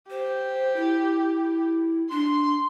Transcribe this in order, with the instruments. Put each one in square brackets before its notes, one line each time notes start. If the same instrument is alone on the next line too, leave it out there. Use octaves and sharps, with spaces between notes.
[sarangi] G4 [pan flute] C5
[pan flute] E4
[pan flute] D4 [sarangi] C6